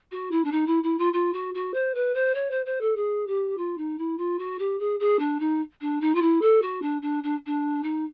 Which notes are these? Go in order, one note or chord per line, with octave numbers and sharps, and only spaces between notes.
F#4
E4
D4
D#4
E4
E4
F4
F4
F#4
F#4
C5
B4
C5
C#5
C5
C5
A4
G#4
G4
F4
D#4
E4
F4
F#4
G4
G#4
G#4
D4
D#4
D4
D#4
F4
E4
A4
F#4
D4
D4
D4
D4
D#4